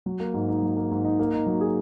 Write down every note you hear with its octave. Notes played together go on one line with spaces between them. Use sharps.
F#3
A#3
G#2
D#4
F#3
A#3
G#2
D#4
A#3
D#4
F#3
G#4